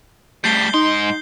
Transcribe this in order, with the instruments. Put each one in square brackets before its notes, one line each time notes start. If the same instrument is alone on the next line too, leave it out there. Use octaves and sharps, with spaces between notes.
[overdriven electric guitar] G3 A3 [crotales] G6 C7 G7
[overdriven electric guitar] G#2 C6 [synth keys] D#4